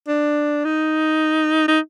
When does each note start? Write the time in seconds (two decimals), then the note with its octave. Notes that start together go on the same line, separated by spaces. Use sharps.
0.08 D4
0.65 D#4
1.68 D#4